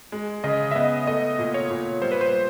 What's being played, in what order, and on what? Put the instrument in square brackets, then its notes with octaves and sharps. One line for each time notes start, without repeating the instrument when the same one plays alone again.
[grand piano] G#3
[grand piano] C#3 [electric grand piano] D#5
[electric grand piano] E5
[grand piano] B3 [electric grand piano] D#5
[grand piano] A3 [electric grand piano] D#5
[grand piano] A#2
[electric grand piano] C#5
[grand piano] A#2
[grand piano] G3 [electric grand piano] C5
[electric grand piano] B4
C5